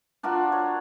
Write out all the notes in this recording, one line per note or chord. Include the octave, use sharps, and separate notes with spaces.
D4 F4 F#4 A#4
C#5